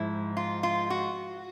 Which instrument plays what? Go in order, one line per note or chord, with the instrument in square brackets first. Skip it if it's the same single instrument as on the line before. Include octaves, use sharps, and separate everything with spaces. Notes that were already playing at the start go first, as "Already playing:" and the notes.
Already playing: [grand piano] G#2 F3 [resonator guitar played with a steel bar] E4
[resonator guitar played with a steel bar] F4
F4
F#4